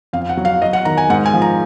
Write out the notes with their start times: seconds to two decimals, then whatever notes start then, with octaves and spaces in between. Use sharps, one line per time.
0.13 F2 F5
0.29 F#5
0.37 F#3
0.45 F5
0.62 F#3 D#5
0.73 F#5
0.85 D#3 A#5
0.97 G#5
1.10 G#2 F#5
1.26 G#5
1.34 F3
1.42 A#5